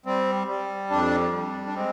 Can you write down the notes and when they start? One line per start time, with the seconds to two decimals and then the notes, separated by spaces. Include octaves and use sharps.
0.06 G3 C4
0.47 G3
0.90 F2 D4
1.32 G3
1.67 D4
1.75 G#3 C4